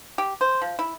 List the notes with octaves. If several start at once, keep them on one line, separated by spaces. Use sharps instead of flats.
G4
C5
F3
E4